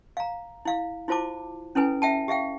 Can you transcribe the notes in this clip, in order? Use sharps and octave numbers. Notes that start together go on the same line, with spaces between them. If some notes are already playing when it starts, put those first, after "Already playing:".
F5 A#5
E4 F5
E4 F4 C5 A5 D6
C#4 E4 A4 B4 G#5
E5 G5 A5
G4 E5 F5 G5